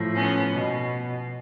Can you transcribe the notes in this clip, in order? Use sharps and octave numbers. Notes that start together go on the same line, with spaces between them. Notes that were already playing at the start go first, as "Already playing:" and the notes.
Already playing: A2 F3
B3 C#4
B2